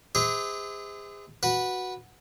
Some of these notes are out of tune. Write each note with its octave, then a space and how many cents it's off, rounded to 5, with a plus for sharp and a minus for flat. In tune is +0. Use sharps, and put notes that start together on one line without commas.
G#4 -35 C5 -40 E5 -40
F#4 -5 B4 -10